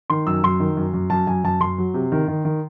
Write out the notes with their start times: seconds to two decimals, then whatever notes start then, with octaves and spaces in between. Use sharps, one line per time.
0.10 D#3 C6
0.27 F#2 E6
0.43 F#2 C6
0.60 D#3
0.77 F#2
0.94 F#2
1.10 F#2 A5
1.27 F#2 G#5
1.44 F#2 A5
1.61 F#2 C6
1.78 F#3
1.94 C3
2.12 D#3
2.28 D#3
2.45 D#3